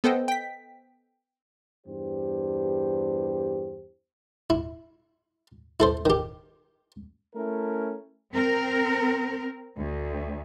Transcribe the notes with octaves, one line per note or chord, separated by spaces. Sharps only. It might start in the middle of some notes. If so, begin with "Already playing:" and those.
B3 A4 C5 D#5 G5
G5 B6
E2 G2 G4 C5
E4
E4 A4 C5
D#3 G4
A3 C#4 E4 A#4
C4 A#4
D2